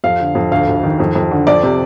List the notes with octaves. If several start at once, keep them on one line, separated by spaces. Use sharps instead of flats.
F2 F5
D3
F2
D2 F5
D2
D#3
F2
F2
D3
F2 D5
C3